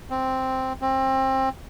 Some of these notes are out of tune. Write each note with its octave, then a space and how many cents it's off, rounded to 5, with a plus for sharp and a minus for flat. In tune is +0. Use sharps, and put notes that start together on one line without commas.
C4 +0
C4 +25